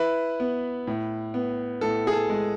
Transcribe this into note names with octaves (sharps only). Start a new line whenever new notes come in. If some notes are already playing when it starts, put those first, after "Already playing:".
Already playing: E4 B4
B3
A2
B3
A2 A4
G#4
A4
G#3